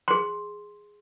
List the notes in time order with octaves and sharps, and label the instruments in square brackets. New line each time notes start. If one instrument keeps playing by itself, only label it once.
[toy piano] G#4 C6